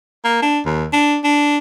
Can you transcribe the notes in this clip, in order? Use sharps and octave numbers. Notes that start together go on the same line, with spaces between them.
A#3
D4
D#2
D4
D4